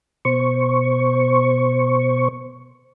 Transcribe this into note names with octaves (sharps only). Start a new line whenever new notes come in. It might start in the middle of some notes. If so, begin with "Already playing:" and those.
B2 C5 C#6